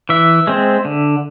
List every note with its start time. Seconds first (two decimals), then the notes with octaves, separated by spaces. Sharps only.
0.09 E3 E5
0.47 G#3 C4
0.85 D3